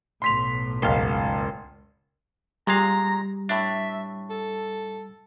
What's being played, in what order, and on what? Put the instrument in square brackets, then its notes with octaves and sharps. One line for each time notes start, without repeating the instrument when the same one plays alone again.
[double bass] B1 A2 [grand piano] C6 B6 F7
[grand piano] F#1 G#2 [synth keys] C#2 F5 C6
[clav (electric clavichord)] A#2 G#3 F5 [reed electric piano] G3 [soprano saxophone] A#5
[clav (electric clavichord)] A2 D4 [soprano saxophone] E5
[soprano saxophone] A4